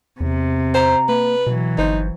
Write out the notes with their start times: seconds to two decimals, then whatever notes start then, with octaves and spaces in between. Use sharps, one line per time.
0.20 E2 C3
0.74 C5 A#5
1.09 A#3 B4
1.47 B2 E3 F#3
1.78 G1 D#4 C5